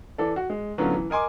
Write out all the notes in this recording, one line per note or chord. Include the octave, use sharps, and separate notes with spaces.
E3 A4 D5
F#4
G#3
A2 D3 F#3 B3 C#4 F4
E3
A#4 D#5 G#5 C6 D6